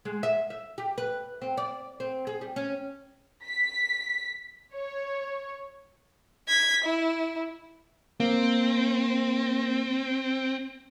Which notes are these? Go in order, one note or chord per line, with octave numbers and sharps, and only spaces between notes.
G#3
E5
E5
G4
B4
C4
D5
C4
G#4
G3
C#4
B6
C#5
G#6 B6
E4
A#3 C4